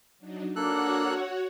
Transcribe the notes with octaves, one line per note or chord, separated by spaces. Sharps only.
F#3 D4 D#4
A#3 D4 F#4 A4 C#5 F#5 F#6